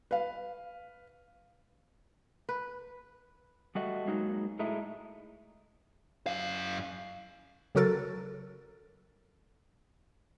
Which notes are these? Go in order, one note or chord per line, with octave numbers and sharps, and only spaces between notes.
B4 F5
B4
G3 A3 F#4 D#5
F#3 G#3 A#3 D#4 F#4
A2 G#3 A3 D#4 E4
F#2 F5
C#3 F#3 F#4 A4 A#4 A6